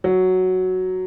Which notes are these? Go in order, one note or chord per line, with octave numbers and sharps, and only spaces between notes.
F#3